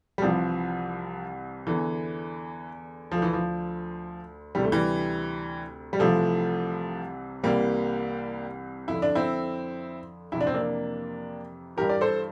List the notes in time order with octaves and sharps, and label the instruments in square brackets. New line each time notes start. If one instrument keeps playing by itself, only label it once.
[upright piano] G3
C2 C3 E3 F3
E2 D3 E3
D2 D3 F3
E3
F3
D2 C3 E3 G3
A3
E3 G3
G3
C2 C3 E3 F3 A3
C2 C3 E3 G3 A#3
F2 D3 E4
D4
C4 E4
F2 C3 E3 E4
D4
C4
A#3 D4
G2 E3 G4 A#4
D5
A4 C5